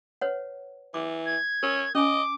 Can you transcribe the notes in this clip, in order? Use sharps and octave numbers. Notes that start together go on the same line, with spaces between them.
B4 C#5 F#5
E3 D6
G#6
C#4 A#4
C#4 D#5 G#5 D6